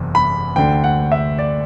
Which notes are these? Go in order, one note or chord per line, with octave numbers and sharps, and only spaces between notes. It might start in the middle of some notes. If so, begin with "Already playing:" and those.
Already playing: F#1 E2 C3
B5
D2 D3 G5
F#5
E5
D5